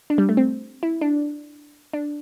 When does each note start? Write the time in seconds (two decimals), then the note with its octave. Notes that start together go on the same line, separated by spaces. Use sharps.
0.10 D4
0.18 G3
0.29 A3
0.37 C4
0.83 E4
1.01 D4
1.93 D4